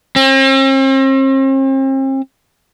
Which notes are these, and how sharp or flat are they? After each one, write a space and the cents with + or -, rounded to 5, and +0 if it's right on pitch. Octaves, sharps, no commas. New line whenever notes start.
C4 +45